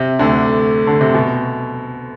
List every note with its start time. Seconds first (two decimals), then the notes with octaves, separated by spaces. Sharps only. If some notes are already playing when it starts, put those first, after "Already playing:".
Already playing: C3
0.19 D2 D3
0.87 D3
1.01 C3
1.14 B2